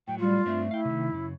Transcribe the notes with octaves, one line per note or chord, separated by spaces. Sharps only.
A2 F#3 G5
G3 F4
G2 A3 C4 D4
E4 F5 G5
C3 D#3
F#2 C#3